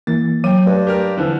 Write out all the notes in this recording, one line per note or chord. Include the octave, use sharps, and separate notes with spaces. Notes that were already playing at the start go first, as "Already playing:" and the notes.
E3 A#3 A6
F#3 G5 D#7
G2 A3
G4 A#4 F6
D3 E3 F3 C4 B4